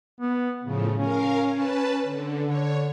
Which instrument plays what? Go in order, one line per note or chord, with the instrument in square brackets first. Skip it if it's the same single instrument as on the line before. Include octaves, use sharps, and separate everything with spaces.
[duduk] B3
[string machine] A2 F3 [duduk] C#3
[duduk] C#4 [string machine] A#4 F5
[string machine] B4 A5
D3
[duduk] D3 [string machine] C#5